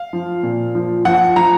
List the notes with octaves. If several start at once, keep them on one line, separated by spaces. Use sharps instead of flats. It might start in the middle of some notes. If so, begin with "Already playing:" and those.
Already playing: F5
F3
A#2
F3
F3 F#5
F3 A#5